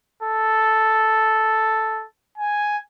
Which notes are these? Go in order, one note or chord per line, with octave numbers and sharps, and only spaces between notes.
A4
G#5